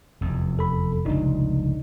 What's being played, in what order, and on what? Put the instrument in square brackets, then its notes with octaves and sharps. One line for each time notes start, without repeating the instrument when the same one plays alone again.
[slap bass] F1 E2
[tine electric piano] A4 B5
[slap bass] F1 C#2 [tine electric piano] D4 D#4